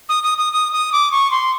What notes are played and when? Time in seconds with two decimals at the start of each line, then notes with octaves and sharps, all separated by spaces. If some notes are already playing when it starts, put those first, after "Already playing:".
0.09 D#6
0.23 D#6
0.38 D#6
0.53 D#6
0.73 D#6
0.92 D6
1.12 C#6
1.31 C6